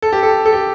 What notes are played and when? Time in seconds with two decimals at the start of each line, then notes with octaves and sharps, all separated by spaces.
0.02 A4
0.13 G4
0.23 A4
0.46 A4
0.53 G4